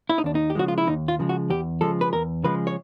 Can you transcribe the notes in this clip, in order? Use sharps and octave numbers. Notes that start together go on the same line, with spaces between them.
E4
D#4
D#2 D4
D#4
G4
C#3 F3 G#3 F#4
F4
E4
D#2 D#4
F4
C#3 F3 G#3
F#4
E2 G4
C#3 F3 G#3 A4
B4
E2 A#4
C#3 F3 G#3 B4
C#5